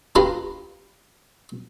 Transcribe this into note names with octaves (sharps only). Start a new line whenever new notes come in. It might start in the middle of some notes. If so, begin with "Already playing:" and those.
D4 F4 G4 B4 A#5 C6